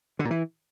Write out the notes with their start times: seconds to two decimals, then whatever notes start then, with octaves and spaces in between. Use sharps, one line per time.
0.19 D3
0.25 A#2
0.31 E3